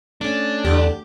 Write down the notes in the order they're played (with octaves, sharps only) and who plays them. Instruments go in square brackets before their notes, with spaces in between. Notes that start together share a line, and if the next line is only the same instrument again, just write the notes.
[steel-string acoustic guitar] A3 C#4 [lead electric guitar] D4
[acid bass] E2 [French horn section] D3 [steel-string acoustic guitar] G4